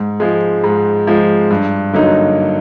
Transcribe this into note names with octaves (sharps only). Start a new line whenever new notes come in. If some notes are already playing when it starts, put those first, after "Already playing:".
Already playing: G#2
F3 G#3
G#2
F3 G#3
G2
D3 F#3 A#3 D#4